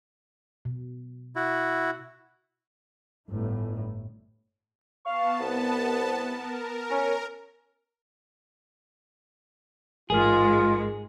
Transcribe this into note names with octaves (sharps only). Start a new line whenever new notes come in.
B2
E4 F#4
G1 A2
B3 F5 A5 C#6
C2
A#4
C#4
A1 G#2 G#3 F4 G#4 A#4 F6